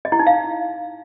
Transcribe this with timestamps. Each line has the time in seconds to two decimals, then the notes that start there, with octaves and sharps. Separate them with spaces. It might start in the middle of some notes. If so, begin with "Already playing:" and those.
0.05 D#5
0.12 E4
0.19 D#4
0.27 F5